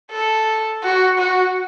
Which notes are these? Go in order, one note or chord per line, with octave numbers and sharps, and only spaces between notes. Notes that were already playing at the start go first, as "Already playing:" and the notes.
A4
F#4
F#4